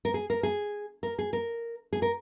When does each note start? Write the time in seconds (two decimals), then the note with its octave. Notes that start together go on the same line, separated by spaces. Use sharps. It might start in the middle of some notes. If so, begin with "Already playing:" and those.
0.05 A#4
0.14 G#4
0.30 A#4
0.43 G#4
1.03 A#4
1.19 G#4
1.33 A#4
1.93 G#4
2.02 A#4